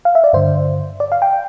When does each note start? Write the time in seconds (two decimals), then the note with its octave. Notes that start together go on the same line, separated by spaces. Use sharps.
0.05 F5
0.15 E5
0.24 D5
0.33 G2 D3 C5
1.00 D5
1.12 F5
1.22 G5